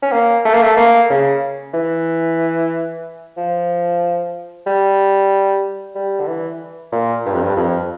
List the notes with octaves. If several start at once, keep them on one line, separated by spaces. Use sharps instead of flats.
C#4
A#3
A3
A#3
A3
A#3
C#3
E3
F3
G3
G3
D3
E3
A#2
G2
F2
G2
F2